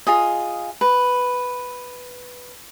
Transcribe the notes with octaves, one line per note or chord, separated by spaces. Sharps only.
F4 G#4 D#5
B4